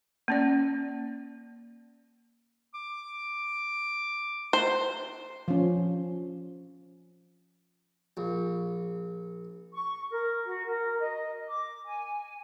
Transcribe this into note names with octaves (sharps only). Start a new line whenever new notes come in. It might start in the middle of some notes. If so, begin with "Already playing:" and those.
A#3 C#4 D5
D6
C5
F3 C#4
A#1
C#6
A#4
F#4
A#4
D#5
D6
G#5